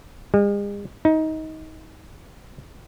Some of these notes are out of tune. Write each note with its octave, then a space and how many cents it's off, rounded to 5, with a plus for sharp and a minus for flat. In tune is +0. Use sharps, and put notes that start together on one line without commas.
G#3 -45
D#4 +20